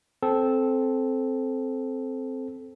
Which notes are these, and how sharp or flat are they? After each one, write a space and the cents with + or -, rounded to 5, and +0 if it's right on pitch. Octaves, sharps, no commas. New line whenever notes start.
C4 +0 A4 -15